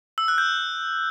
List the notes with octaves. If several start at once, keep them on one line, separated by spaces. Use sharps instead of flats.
E6
F#6
G6